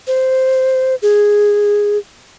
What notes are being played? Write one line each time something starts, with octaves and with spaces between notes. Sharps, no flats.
C5
G#4